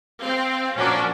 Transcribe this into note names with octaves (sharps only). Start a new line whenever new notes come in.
C4 F5
A#2 F3 C#4 D4 F#4 A#4